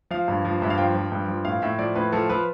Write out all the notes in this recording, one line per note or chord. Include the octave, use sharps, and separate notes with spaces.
F3 F5
G2
F3
G2 E5
F5
F3 G5
F3
G2
F3
A2 F5
A2 E5
F3 D5
A2 B4
F3 A4
F3 B4